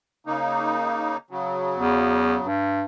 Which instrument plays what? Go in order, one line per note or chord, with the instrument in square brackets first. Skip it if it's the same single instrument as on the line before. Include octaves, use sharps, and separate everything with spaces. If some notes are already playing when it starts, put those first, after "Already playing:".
[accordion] C#3 A#3 D#4
C#3 F#3
[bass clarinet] E2
G2